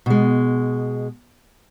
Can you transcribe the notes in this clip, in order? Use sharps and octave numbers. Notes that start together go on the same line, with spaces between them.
B2 G#3